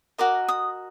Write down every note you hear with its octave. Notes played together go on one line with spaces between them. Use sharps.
F#4 A#4 D#5 D6
D#6